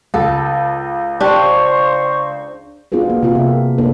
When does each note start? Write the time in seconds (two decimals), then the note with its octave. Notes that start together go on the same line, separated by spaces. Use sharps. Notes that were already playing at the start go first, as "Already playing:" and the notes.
0.14 C#2 A4
1.20 D4 G4 C5 C#6
2.92 B3 D4 F4 F#4 G#4 B4
3.10 A#3
3.23 C3 A#3 B3 F4 G4 G#4
3.35 F4 E5
3.48 A#4
3.78 A#3 D4 A4 B4 C#5